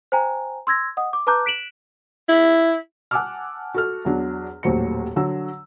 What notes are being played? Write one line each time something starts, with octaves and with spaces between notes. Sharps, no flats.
C5 G5 G#5 A#5
C6 E6 G#6 A#6
D#5 F#5 D#6
D6
B4 A5 A#5 D6 F#6 G6
F#6 B6 D7 E7 F#7
E4
F#5 G#5 A5 D6 E6 F6
F#4 A4 F6
E2 F#3 D4
D#1 D#2 A2 F#3 C5 C#7
D3 F#3 E6